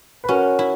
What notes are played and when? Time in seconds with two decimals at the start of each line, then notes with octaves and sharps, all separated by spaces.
0.24 B4
0.29 C#4 F#4 A#4
0.59 E4